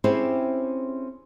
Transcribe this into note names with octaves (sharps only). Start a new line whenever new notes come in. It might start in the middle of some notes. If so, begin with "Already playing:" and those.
C4 C#4 E4 G4 G#4 C5